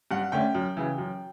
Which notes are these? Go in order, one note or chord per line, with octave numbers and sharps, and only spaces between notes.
G2 F#5
D3 A3 C#4 G5
F#2
C#3 E3
F#2